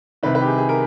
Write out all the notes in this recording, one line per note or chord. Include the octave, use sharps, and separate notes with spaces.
C2 C3 D#3 B4
B4
G4
G#4
G#4
A#4